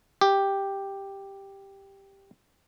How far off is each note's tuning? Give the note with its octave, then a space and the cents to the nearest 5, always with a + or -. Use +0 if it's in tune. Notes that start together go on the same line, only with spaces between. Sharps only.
G4 +5